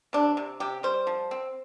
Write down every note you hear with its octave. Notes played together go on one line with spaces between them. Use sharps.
C3 D4
C3
C3 G4
G3 C5
F3
C4